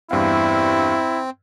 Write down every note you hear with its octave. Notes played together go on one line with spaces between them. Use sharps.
E2 G2 C4 E4 F5